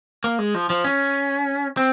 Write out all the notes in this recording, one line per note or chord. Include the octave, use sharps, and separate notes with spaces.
A#3
G#3
F3
F3
C#4
C4